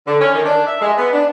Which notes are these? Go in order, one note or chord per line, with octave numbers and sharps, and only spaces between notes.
D3
C#4
D#3
D4
E5
G#3
B3
D4